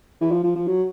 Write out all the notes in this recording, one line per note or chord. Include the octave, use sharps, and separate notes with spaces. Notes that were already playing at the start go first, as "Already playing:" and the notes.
E3
F3
F3
F3
F#3